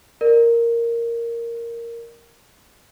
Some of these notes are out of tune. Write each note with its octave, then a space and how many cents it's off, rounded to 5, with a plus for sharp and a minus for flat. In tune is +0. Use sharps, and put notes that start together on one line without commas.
A#4 -5 D5 +25